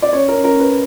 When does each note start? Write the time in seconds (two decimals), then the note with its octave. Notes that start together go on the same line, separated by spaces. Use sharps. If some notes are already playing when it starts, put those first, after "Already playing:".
0.02 D5
0.13 C#4 C#5
0.28 A#4
0.34 C#4
0.44 A#4
0.55 C#4 B4